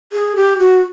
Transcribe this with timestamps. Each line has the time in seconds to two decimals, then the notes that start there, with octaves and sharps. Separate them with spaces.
0.13 G#4
0.36 G4
0.59 F#4